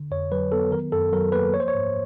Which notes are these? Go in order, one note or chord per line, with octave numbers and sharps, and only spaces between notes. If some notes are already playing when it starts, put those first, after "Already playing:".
Already playing: D3
F2 C#5
F#3 B4
B3 A4
D#3 A#4
F#2 A4
F#3 A#4
A#3 B4
F3 C#5
C5
C#5
G#2